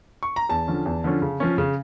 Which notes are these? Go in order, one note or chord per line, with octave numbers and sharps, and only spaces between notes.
C#6
A#5
E2 A5
D3 F3 C#4
E2
D3 F3 C#4
C#3
F3 C#4
C#3